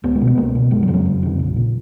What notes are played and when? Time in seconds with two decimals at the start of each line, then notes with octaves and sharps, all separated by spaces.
0.04 C#2 B3
0.15 G#3
0.21 B2
0.27 B3
0.37 C#2 A#3
0.55 B2
0.71 F#1 G#3
0.83 F#3
0.88 F2 C#3
0.94 F#3
1.05 F#1
1.23 F2 C#3
1.39 A#1
1.56 A#2